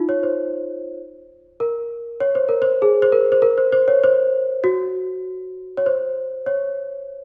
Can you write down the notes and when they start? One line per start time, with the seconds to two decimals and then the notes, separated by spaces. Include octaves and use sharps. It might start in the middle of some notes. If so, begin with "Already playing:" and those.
Already playing: D#4 F4
0.09 C#5
0.23 C5
1.60 A#4
2.20 C#5
2.35 C5
2.49 A#4
2.62 C5
2.82 G#4
3.02 C5
3.12 A#4
3.32 C5
3.42 A#4
3.58 C5
3.72 C5
3.88 C#5
4.04 C5
4.64 F#4
5.77 C#5
5.86 C5
6.46 C#5